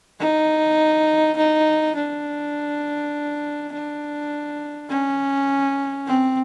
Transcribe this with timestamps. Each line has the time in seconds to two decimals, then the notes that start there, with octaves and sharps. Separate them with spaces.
0.20 D#4
1.37 D#4
1.96 D4
3.73 D4
4.90 C#4
6.07 C4